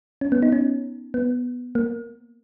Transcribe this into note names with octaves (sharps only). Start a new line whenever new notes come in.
C#4
B3
D#4
C#4
B3
A#3